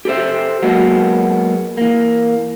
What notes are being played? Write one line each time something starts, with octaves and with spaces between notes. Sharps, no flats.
G4 A4 B4 C5 E5
F#3 G#3 A#3 B3 F#4
E3 A#3